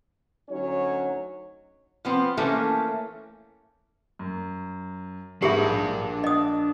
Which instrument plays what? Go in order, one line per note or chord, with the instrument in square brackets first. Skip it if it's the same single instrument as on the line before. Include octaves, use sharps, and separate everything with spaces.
[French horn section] D2 F#3 C#4 D#4 C#5
[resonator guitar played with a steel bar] F3 B3 C4
E3 A3 A#3 C4 C#4
[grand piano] F#2
[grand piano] G#2 D#6 [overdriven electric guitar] D4 B5 [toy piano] G4 G#4 E5
[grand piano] A#1 A#3
[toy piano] D#5 D#6